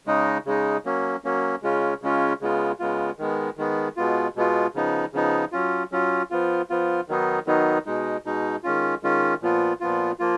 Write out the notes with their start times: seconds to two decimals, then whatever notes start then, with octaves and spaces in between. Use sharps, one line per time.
0.07 C#3 G#3 D#4
0.46 C#3 G#3 D#4
0.85 F#3 A#3 C#4
1.24 F#3 A#3 C#4
1.63 C#3 G#3 C#4 F4
2.02 C#3 G#3 C#4 F4
2.41 C#3 G#3 B3 F4
2.79 C#3 G#3 B3 F4
3.19 D#3 G#3 B3
3.57 D#3 G#3 B3
3.97 B2 G#3 B3 F4
4.36 B2 G#3 B3 F4
4.74 C#3 F3 B3 D#4
5.13 C#3 F3 B3 D#4
5.52 F#3 C#4 F4
5.92 F#3 C#4 F4
6.31 F3 B3 F4
6.70 F3 B3 F4
7.08 D#3 F#3 B3 D#4
7.47 D#3 F#3 B3 D#4
7.86 B2 G#3 D#4
8.25 B2 G#3 D#4
8.64 D#3 G#3 C#4 F4
9.03 D#3 G#3 C#4 F4
9.42 A#2 F3 B3 F4
9.81 A#2 F3 B3 F4
10.20 F3 A#3 F4